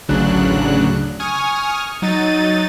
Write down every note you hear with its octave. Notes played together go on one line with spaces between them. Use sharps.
A1 D2 C#3 F#3 D4 F#6
G#5 C#6 D#6 F6
F#3 D#4 A6 D#7